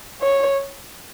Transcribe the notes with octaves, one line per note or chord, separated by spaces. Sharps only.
C#5